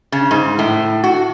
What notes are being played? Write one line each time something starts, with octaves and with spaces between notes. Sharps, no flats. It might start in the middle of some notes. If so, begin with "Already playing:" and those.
C#3
G#2
A2
F#4